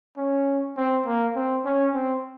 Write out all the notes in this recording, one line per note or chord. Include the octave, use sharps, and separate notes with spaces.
C#4
C4
A#3
C4
C#4
C4